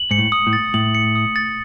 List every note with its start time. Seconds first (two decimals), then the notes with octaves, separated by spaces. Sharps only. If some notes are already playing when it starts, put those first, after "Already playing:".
Already playing: F#7
0.11 G#2 C#7
0.18 A2
0.32 D#6
0.47 A2
0.53 A6
0.74 A2 F#7
0.95 C#7
1.15 D#6
1.36 A6